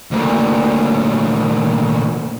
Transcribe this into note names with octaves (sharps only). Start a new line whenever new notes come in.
D2 A#2